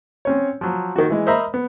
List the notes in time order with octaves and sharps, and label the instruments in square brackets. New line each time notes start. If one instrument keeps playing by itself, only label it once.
[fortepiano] C4 C#4 C#5
F3 F#3
D#3 F#4
E3 G#3
A#4 C5 D#5 E5 A#5 B5
B3